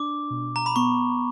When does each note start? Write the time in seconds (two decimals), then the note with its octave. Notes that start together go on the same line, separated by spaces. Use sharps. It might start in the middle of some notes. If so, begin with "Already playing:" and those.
Already playing: D4 D6
0.30 B2
0.56 A#5
0.66 B5
0.76 B3 C#6